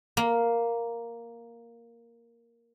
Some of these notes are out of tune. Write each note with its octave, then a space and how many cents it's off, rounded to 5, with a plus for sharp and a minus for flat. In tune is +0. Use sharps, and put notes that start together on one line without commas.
A#3 +0